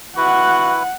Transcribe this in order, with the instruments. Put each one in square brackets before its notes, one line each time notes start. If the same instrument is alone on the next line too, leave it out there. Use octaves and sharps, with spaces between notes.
[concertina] E4 B4 [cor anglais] F#4 [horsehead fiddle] F#5